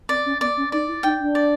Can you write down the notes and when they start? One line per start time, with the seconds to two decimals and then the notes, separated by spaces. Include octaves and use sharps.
0.09 C4 D5
0.25 C#4
0.41 B3 D5
0.56 C#4
0.72 D#4 D5
0.87 E4
1.03 D#4 G5
1.19 D4
1.35 D5